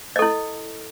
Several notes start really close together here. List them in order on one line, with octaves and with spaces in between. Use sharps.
D#5 A4 E4